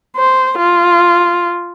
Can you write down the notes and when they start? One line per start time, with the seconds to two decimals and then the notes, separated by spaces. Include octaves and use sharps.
0.16 C5
0.58 F4